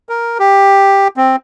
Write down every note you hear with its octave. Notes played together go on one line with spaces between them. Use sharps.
A#4
G4
C4